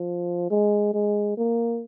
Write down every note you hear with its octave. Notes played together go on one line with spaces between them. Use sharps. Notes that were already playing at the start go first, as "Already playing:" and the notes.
Already playing: F3
G#3
G#3
A#3